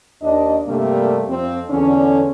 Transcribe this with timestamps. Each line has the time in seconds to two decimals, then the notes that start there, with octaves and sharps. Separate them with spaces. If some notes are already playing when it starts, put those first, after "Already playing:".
0.22 D#2 D4 D#5
0.67 G2 C3 G3 A3 A#3
1.28 F2 C4
1.70 E2 D3 C#4